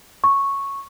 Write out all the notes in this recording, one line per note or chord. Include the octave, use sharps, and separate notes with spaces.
C#6